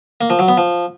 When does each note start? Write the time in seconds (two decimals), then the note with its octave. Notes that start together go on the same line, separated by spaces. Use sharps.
0.21 A#3
0.30 F3
0.39 F#3
0.48 B3
0.57 F3